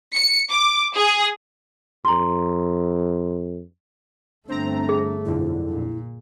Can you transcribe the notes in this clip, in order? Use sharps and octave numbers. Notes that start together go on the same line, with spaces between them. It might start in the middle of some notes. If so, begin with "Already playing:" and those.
C#7
D6
G#4
F2 A#5 C6
G1 A3 C4 D4 A#5
G#4
B1 F2 D3 E4
A#2